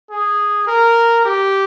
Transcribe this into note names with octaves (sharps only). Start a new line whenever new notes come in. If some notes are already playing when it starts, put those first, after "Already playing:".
G#4
A#4
G4